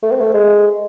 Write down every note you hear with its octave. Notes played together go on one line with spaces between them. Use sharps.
A3
C4
A3
G#3